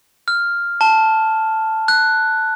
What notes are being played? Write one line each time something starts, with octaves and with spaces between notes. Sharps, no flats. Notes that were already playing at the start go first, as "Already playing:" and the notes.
F6
A5
F#6